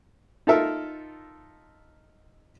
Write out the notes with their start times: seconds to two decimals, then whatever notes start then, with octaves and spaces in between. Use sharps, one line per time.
0.47 D#4 F4 A4 A#4 E5